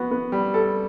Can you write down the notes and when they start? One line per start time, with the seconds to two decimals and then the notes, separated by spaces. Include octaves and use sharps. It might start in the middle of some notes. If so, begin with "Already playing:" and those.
Already playing: B3 F#4
0.11 B3
0.32 G3
0.54 A4